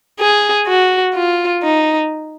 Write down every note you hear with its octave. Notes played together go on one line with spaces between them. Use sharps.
G#4
F#4
F4
D#4